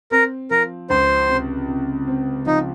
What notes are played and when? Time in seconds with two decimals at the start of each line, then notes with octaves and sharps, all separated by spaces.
0.11 C4 A#4
0.51 F3 A#4
0.90 C#2 C5
1.29 C3
1.68 C3
2.08 C4
2.46 F3 D#4